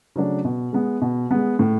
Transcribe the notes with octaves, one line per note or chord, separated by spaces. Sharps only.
C#3 F#3 A3 D4
B2
G#3 B3
B2
G#3 B3
A2